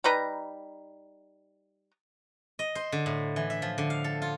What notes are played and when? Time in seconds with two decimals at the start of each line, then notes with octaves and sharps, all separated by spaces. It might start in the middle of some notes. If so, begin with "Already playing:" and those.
0.04 G3 D#4 B4 A#5
2.59 D#5
2.75 C5
2.92 D3
3.06 A2
3.36 E3
3.50 E5
3.62 F3
3.78 D3
3.90 F5
4.04 A4
4.22 F4